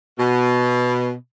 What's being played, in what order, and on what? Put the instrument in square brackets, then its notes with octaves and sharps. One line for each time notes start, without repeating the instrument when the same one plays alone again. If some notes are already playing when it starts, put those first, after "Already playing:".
[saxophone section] B2